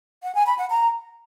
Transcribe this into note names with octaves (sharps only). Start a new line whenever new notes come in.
F#5
G#5
B5
F#5
A#5